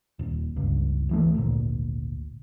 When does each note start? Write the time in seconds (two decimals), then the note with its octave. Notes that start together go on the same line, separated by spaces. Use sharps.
0.19 D#1
0.56 G1 C#2 G2
1.09 D2 E3 A3
1.35 G#1 D2 A#2